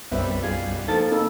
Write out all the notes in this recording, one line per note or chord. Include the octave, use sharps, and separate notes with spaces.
B1 F#2 G3 B3 C4 B4 E5
F4 G#4
D#3 F3 A#3 A4 A6
C#3 A#3 C4 D#4 E6